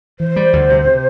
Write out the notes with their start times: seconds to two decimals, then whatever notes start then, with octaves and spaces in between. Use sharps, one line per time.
0.20 E3 C5
0.36 G3
0.53 D2
0.70 C3
0.85 C3